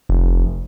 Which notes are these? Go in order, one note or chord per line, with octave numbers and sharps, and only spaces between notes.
F1